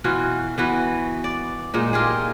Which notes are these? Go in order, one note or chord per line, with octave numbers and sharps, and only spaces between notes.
B2 E3 F4 F#4
E3 B3 F#4
D5
A#2 G#3 D#4
D#4 F4 G4 G#4